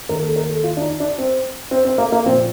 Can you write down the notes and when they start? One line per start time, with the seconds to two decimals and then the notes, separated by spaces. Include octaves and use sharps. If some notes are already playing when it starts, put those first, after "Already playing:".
0.09 D#2 D#3 A#4
0.23 A4
0.36 A#4
0.50 A4
0.63 F4
0.77 D4
0.81 D#4
1.00 D4
1.18 C4
1.71 C4
1.85 C4
1.98 A#3
2.12 A#3
2.26 F3 C4
2.29 A#2